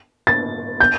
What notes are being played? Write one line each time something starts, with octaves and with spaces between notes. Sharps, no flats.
A6
G6